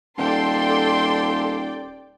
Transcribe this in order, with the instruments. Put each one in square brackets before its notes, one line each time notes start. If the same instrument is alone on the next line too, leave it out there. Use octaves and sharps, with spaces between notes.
[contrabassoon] D#1 [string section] A4 C6 [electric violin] D5 G5